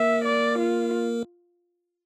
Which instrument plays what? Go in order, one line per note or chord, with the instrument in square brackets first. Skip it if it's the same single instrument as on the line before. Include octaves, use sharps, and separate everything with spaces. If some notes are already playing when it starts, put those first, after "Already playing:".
Already playing: [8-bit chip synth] A#3 A#4 [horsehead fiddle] E5
[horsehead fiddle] D5
F4